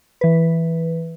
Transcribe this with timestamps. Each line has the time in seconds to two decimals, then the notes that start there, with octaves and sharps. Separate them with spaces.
0.21 E3 B4